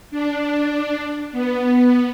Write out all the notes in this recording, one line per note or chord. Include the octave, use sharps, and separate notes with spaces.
D4
B3